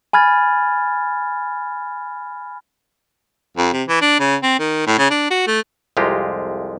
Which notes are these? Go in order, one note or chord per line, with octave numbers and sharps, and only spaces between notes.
G#5 B5 F6 G#6 A6
F2
C3
E3
D4
C#3
C4
D#3
A2
C#3
D4
F#4
A3
C2 F2 G#3 F4 G4 A#5